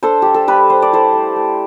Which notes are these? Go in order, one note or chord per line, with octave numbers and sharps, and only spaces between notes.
D4 A4 C5
G3 G4
A4
G3 G4 B4
G3 C5
D5
E4 A4 C5
A3
A3